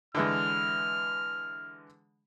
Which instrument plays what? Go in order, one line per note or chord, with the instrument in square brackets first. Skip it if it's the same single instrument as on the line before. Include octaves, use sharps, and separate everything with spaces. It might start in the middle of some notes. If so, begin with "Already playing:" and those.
[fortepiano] D3 E3 G#3 [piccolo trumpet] F6